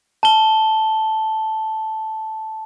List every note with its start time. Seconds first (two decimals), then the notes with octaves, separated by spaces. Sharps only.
0.23 A5 G7